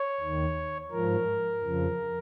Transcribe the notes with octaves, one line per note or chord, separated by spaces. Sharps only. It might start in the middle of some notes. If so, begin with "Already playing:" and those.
Already playing: C#5
D#2 D#3
G#2 F3 A#4
F2 C#3 F3